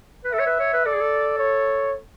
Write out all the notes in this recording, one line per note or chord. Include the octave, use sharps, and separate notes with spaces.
B4
A4 E5
C#5
B4
C#5
B4
A4 D5
G#4
A4
C#5